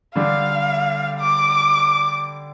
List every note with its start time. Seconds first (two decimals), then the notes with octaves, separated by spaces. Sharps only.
0.15 D3 G3 D4 G4 F5
1.20 D6